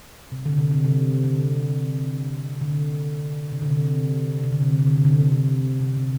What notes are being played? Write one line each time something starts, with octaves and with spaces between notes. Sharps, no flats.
C3
D3
C3
D3
C3
D3
D3
C3
D3
C3
C3
D3
C3
D3
C3
D3
C3
D3
C3
D3
C3
C3
C3